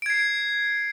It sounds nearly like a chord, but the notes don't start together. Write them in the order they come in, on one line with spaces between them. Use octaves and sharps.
D7 G#6 C7